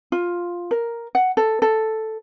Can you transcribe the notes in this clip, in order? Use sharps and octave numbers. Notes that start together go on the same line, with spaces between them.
F4
A#4
F#5
A4
A4